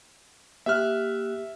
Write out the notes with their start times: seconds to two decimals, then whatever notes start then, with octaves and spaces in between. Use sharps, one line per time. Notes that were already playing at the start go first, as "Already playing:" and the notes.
0.66 A#3 G4 E5 F6 F#6